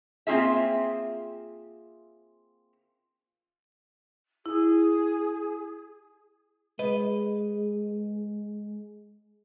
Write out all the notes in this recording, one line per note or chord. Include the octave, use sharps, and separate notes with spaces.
A#3 C4 F4 G#4 E5
E4 G#4
G#3 B4 D#5